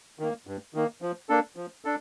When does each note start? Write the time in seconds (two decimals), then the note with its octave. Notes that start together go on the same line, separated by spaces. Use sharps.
0.19 D#3 A#3
0.47 G2
0.74 D#3 A#3
1.02 F3
1.29 A#3 D4 A4
1.56 F3
1.85 D4 A4